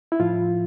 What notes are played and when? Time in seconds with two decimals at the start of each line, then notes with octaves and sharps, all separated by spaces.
0.12 E4
0.20 A2 F3 F4